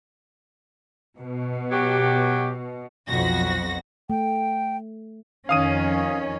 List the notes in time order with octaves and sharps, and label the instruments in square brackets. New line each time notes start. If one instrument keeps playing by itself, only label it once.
[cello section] B2
[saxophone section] F#3 F#4 G4
[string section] B1 F2 F#4 A#6
[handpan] A3 [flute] G5
[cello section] F2 D#3 C#4 [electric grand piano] F5 D#6 D#7